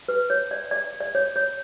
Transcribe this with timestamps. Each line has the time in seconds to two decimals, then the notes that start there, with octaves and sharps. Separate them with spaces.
0.08 B4
0.30 C#5
0.51 D5
0.71 D5
1.01 D5
1.15 C#5
1.36 C#5